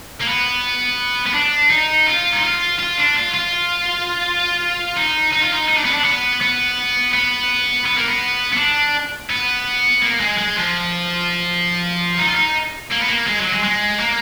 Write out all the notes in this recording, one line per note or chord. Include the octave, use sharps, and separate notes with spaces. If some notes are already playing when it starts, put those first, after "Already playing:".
A#3
B3
B3
D4
D#4
F4
D#4
F4
F4
D4
F4
F4
D#4
D#4
F4
D#4
D#4
D4
B3
D4
B3
B3
B3
B3
A#3
B3
B3
D4
B3
A#3
G#3
G#3
F3
D#4
F4
D#4
A#3
B3
A#3
G#3
F#3
G#3
G#3
A#3